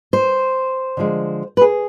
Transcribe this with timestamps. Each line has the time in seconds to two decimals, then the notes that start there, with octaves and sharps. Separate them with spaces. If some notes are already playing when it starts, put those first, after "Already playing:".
0.13 C5
0.97 D3 F3 G#3
1.57 B4
1.61 G#4